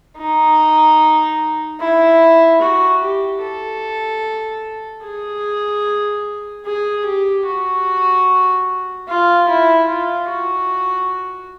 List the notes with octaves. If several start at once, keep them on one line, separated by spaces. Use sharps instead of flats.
D#4
E4
F#4
G4
A4
G#4
G#4
G4
F#4
F4
E4
F4
F#4